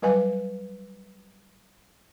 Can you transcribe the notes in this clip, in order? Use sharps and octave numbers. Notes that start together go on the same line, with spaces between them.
F#3 G3 B4 D#5 F5 G#5